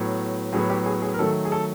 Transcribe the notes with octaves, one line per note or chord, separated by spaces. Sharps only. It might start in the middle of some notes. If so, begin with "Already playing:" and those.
Already playing: A2 F#3 B3
A2 F#3 B3 G#4
G4
G#4
G#4
A#4
D#3 F#3 A3 A4
G#4
A4